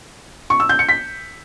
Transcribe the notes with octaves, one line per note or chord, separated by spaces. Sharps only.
C#6
E6
G6
C#7
B6